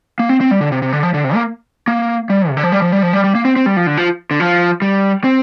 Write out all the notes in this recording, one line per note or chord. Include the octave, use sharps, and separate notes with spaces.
A#3
C4
C4
G3
D3
C3
C3
D3
F3
D3
C3
A#3
A#3
G3
C3
D3
F3
G3
F3
G3
F3
G3
G3
A#3
C4
C4
G3
F3
D3
F3
D3
F3
G3
C4